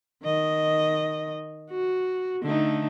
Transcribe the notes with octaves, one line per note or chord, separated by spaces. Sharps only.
D#3 D#5
F#4
D3 A3 D#4